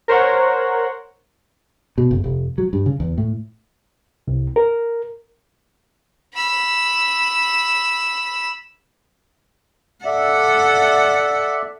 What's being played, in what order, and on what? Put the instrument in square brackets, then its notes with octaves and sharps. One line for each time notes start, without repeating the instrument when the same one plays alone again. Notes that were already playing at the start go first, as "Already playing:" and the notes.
[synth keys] A#4 C5 C#5 F#5
[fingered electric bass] B2
F#1
F1
F#3
G2
C#3
E2
A2
[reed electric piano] C2
A#4
[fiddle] B5 E6
[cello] A4 F#5 [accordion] D5 E5